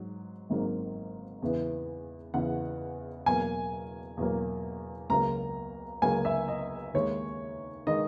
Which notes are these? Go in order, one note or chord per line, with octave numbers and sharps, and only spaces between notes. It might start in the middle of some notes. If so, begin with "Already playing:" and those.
Already playing: G#2 F#3
G#1 G#2 F#3 A#3
E2 C#3 E3 B3
E2 C#3 E3 B3 F#5
E2 B2 F#3 A#3 G#5
E2 B2 F#3 A#3
C#2 C#3 F#3 A#3 A#5
C#2 C#3 F#3 A#3 G#5
E5
D#5
D#2 D#3 G#3 C#5
D#3 G#3 D#5